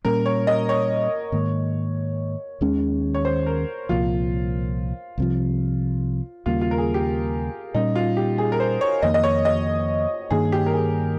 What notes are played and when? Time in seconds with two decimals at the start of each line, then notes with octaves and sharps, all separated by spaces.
0.04 A#2 G3 A#3 C#4 A#4
0.26 C#5
0.47 D#5
0.69 C#5
1.32 G#2 D#3 A#3
2.61 D#2 D#3 G#3 C#4
3.14 C#5
3.25 C5
3.46 A#4
3.89 C2 A#2 F3 F4
5.18 C2 C3 F3
6.46 D#2 C#3 G3 A#3 F4
6.61 F4
6.71 A#4
6.78 G#4
6.94 G4
7.74 A#2 G3 C#4 D#4
7.96 F4
8.17 G4
8.38 G#4
8.52 A#4
8.60 C5
8.81 C#5
9.02 F2 D#3 A#3 D#5
9.14 D#5
9.24 C#5
9.45 D#5
10.31 G2 D#3 A#3 G#4
10.52 G4
10.66 A#4
10.74 G#4